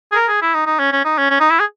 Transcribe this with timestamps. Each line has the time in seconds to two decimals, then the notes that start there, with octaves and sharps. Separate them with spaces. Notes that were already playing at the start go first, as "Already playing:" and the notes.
0.12 G#4
0.15 A#4
0.28 G#4
0.42 E4
0.54 D#4
0.66 D#4
0.79 C#4
0.93 C#4
1.05 D#4
1.18 C#4
1.30 C#4
1.40 D#4
1.50 E4
1.60 G#4